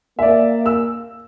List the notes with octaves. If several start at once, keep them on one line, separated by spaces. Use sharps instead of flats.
A#3 D5 E5
E6